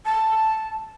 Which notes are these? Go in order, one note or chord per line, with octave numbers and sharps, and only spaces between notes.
A5